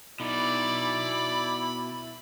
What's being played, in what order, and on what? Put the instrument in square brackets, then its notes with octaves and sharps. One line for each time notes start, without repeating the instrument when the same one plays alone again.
[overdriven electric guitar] B2 D#4 [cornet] E4 [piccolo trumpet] D5 [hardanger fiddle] B5